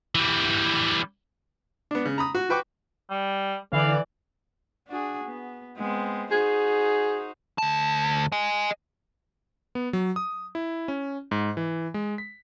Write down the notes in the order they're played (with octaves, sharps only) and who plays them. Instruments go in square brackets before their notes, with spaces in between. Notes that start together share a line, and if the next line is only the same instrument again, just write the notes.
[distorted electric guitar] E3 G3
[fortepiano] B3 D4
C#3
A#5 B5 D#6
F#4
F#4 B4 G5 C#6 D6
[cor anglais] G3
[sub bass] D3 [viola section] E3 D5 [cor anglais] F5
[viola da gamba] D4 F#4 G#4
B3
G#3 B3 C4
[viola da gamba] D#4 F#4 C5 [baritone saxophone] G#4
[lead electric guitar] D2 A5
D#5 G#5
[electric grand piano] B3
F#3
D#6
E4
C#4
G#2
E3
G#3
B6